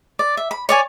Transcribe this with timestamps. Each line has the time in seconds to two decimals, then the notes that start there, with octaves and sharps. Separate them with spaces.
0.19 D5
0.37 E5
0.51 B5
0.69 C#5 D5 G#5